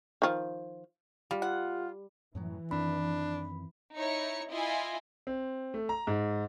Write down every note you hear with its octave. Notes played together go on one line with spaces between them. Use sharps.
D#3 F3
G3 F4
F4 F#5
F#2 A2 E3 F#3
F#2 D#3 C4 D4 B5
D#4 E4 C#5 C#7
E4 F4 D#5 G#5
C4
A3
A#5
G#2